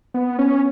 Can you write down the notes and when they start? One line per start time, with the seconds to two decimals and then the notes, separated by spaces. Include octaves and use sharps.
0.14 B3
0.39 C#4